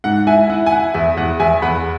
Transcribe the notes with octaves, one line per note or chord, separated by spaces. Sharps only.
G#2 F#5
E4 E5 G#5
E4 F#5
G#5
E4 F#5
E2 E5
E2 F#5
E2 E5 G#5
E2 F#5 B5